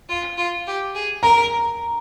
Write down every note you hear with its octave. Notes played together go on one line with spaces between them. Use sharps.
F4
F4
G4
G#4
A#4 A#5